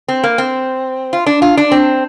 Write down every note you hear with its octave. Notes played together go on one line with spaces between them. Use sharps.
C4
A#3
C4
F4
D4
F4
D4
C4